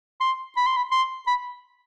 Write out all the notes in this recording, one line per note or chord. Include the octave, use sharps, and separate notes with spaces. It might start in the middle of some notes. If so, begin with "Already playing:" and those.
C6
B5
C6
B5
C6
B5